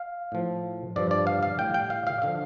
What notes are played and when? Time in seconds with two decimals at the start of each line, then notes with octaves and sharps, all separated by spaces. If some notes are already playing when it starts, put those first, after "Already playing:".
Already playing: F5
0.32 A2 F3
0.96 G2 F3 D5
1.11 D5
1.27 F5
1.43 F5
1.59 A2 G3 G5
1.74 G5
1.90 F5
2.07 F5
2.22 D3 F3 F5